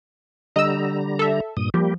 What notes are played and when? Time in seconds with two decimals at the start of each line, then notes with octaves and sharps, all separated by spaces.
0.56 D3 G3 D#5 A#5 E6
1.19 A4 E5
1.57 G2 A#2 D#6
1.74 F3 G3 A#3 G4